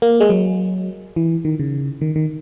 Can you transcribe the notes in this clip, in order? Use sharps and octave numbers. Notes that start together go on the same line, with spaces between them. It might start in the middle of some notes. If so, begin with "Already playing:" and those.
A#3
G#3
F#3
E3
D#3
C#3
D#3
D#3